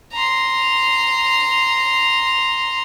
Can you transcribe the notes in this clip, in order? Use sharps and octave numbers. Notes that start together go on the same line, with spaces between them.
A#5 C6